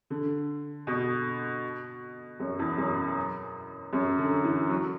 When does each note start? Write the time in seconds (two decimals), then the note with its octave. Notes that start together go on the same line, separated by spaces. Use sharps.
0.10 D3
0.87 B2
2.40 F#2
2.59 E2
2.78 F#2
3.93 F#2
4.18 D3
4.44 E3
4.70 F#3